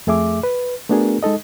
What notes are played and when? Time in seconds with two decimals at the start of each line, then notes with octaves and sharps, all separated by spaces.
0.07 F2 A3 G#4 E5 D6
0.43 B4
0.89 A3 B3 D4 F#4 G#4 A#4
1.23 G#3 D#4 A4 D#5